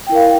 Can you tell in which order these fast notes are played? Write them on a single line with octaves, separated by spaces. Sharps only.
G5 E4 A#4 F5